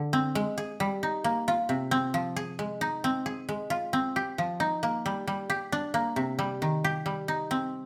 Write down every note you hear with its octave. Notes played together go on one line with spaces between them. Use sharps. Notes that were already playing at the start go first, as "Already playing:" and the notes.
Already playing: D3
C4
G#3
G#4
G3
D#4
A#3
F4
C3
C4
F3
G#4
G#3
D#4
C4
G#4
G#3
F4
C4
G4
F3
D#4
A#3
G3
G3
G4
D4
A#3
C3
G3
D#3
G4
G3
D#4
C4